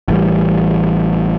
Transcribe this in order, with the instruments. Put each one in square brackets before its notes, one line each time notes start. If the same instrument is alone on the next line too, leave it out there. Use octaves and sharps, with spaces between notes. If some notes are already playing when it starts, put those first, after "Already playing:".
[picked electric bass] A1 E3 G3